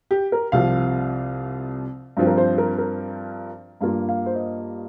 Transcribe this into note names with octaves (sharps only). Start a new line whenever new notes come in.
G4
A#4
C2 C3 F3 F5
G2 F3 C4
A#4
C5
A#4
A#4
G2 G3 A#3 F4 F5
F5
C5
D#5